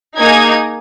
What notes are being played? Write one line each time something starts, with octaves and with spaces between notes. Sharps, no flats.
A#3 D#4 G#4 G#6